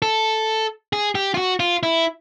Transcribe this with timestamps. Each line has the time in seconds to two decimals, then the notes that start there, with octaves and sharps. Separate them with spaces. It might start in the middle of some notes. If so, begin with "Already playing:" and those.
0.02 A4
0.93 G#4
1.15 G4
1.34 F4
1.37 F#4
1.60 F4
1.83 E4